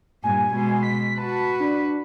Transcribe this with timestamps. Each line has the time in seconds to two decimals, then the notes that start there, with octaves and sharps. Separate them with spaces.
0.24 G2 A#2 G#5
0.54 B2 G#3
0.83 B6
1.18 F#4 B4 A5
1.60 D4